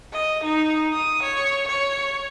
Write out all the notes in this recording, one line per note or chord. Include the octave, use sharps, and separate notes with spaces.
D#5
D#4
D#6
C#5
C#5